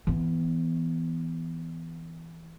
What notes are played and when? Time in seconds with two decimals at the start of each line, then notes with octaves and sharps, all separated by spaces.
0.07 E3 B3